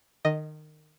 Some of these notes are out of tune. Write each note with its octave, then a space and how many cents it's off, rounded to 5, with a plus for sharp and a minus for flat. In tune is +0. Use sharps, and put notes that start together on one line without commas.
D#3 -25 D#5 +0